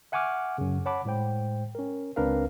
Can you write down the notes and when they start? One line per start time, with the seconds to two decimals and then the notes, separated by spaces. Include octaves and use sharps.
0.12 E5 F#5 G#5 C#6 D6 F6
0.58 F#2 C#3
0.86 C#5 F#5 A5 B5 D6
1.05 A2 G#3 C5 G5
1.75 C#4 A#4
2.16 C#2 C4 D4 A#4 B4 F5